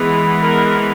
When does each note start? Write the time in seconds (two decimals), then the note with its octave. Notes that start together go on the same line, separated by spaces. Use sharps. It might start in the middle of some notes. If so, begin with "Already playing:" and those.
Already playing: E3 G#3 B3
0.43 A#4